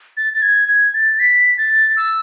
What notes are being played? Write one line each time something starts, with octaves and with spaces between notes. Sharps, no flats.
A6
A6
G#6
G#6
A6
B6
A6
E6